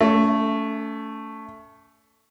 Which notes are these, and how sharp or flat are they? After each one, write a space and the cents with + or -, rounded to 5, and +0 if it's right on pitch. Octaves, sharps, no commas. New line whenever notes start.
A3 +5 C#4 +40